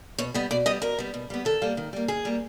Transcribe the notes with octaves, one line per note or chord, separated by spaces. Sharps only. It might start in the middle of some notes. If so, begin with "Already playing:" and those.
B2 C#5
G3 B3 D#5
B2 D5
G3 B3 D#5
B2 A#4
G3 B3
B2
G3 B3
D#3 A4
G3 A#3
D#3
G3 A#3
D#3 G#4
G3 A#3